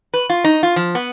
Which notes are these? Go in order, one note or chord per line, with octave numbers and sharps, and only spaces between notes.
B4
F4
D#4
F4
F3
B3